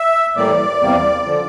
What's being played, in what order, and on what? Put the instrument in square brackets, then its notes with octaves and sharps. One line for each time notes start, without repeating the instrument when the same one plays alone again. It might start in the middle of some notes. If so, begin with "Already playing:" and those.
Already playing: [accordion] E5
A2 E3 G3 A#3 D5
E2 C3 G3 A#3
D3 F3